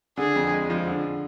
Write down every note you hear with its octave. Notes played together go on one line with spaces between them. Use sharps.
D3 G#4
F2
G#3
F3
D3